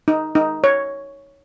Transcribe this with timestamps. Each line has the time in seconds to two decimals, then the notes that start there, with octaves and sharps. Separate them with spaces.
0.08 D#4
0.35 D#4
0.64 C#5